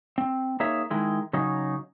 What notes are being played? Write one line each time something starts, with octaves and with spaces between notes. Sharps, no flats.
C4
A#3 D#4 G#4 C#5 E5
D#3 G#3 E4
C#3 F#3 C#4 D#4